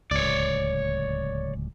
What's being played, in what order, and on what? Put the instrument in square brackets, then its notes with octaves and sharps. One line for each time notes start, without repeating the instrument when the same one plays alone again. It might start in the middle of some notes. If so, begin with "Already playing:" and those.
[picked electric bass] D1 C#2 [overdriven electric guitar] C#5 D5